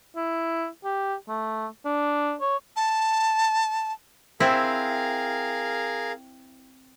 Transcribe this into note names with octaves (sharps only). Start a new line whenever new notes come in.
E4
G4
A3
D4
C#5
A5
C4 E4 G#4 A#4 F5